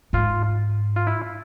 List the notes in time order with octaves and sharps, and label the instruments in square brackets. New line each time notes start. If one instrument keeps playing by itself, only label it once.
[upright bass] G#2 [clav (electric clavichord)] F4
[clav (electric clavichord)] F4
E4